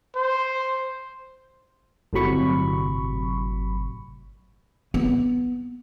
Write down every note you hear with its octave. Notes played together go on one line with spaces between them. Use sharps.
C5
G1 A2 C3 F#3 B5 C#6
B3